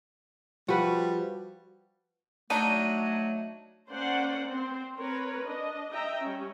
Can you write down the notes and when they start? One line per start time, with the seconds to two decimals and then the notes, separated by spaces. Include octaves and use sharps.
0.68 F3 G3 F#4 B4
2.50 F#3 A3 D4 D#4 A5 D#7
3.89 A#3 C#4 C5 D5 F#5
4.46 C4 C5
4.97 C4 A#4 B4 C#5
5.43 D4 D#5
5.92 D#5 E5 G5 A#5
6.21 G3 C#4